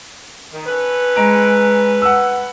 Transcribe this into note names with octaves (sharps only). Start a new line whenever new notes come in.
D#3
C#4 A4 B4
G#3 A#5 D7
F#5 E6